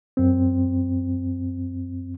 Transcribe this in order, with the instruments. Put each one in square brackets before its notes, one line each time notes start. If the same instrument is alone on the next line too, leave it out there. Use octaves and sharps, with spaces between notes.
[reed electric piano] F#2 C4